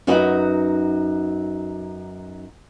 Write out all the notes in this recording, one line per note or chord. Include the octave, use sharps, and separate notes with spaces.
F#2 D#4 F#4 B4 D#5 F#5